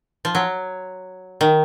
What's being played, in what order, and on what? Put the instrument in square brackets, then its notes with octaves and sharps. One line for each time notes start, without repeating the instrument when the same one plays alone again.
[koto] F3
F#3
D#3